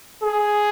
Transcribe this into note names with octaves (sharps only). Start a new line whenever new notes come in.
G#4